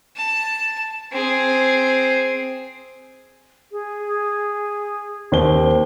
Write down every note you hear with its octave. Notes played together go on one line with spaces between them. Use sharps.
A5
C4 G#4
G#4
D#2 C5 G7